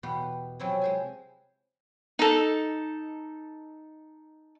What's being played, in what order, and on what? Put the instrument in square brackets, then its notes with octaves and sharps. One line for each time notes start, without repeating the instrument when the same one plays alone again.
[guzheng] E2 B2 B3 G4 B4 F#5
C3 F3 F#3 C4 C#4 E4
G#3 C5 G#5
[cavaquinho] D#4 A4